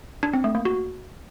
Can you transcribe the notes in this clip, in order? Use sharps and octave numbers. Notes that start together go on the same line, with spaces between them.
D4
C4
A3
A#3
F#4